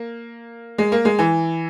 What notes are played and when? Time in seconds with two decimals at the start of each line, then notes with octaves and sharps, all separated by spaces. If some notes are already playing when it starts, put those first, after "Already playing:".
Already playing: A#3
0.78 G#3
0.92 A#3
1.05 G#3
1.19 E3